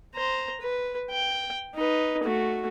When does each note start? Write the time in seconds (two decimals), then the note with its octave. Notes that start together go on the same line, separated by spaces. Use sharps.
0.15 C5 A#5
0.61 B4
1.11 G5
1.75 D#4 B4
2.24 A3 F#4